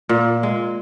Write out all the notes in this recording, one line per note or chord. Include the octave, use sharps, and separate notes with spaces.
A#2
G#3